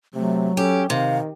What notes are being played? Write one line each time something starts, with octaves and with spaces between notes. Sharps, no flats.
C3 F#3 A3
C#4 G4 A4
C3 D#3 F5